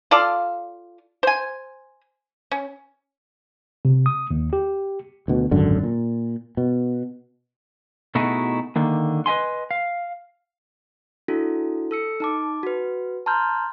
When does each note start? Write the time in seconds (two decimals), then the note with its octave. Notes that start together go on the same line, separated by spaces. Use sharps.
0.11 F4 A4 D5 F5
1.23 C5 G#5
2.51 C#4
3.85 C3
4.06 D#6
4.31 D#2
4.53 G4
5.28 D2 B2
5.51 D1 G#1 F#2 D3
5.83 A#2
6.57 B2
8.15 B2 A3 D#4 E4 F#4 G#4
8.76 D3 D#3 A#3
9.26 B4 D#5 E5 G#5 C6
9.71 F5
11.28 D4 E4 F#4 A4
11.91 A4 E6 C#7
12.20 D#4 A5 D6
12.63 F#4 B4
13.26 A5 A#5 C6 F6 G6